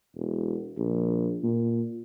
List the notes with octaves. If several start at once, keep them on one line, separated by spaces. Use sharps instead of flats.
E1
A#1
A#2